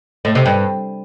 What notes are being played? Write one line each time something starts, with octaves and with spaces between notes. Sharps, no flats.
A2
C3
G2